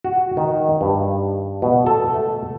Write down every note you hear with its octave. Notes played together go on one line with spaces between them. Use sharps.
F#4
D#3
G2
B2
A4
A3